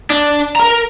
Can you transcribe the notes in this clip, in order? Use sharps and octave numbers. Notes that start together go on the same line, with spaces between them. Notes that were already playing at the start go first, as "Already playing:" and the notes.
D4
A#4 A#5